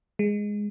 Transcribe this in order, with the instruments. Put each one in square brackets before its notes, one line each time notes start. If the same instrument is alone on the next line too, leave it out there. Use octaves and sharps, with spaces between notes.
[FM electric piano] G#3